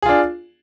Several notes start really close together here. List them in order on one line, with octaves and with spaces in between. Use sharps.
G#4 F4 D4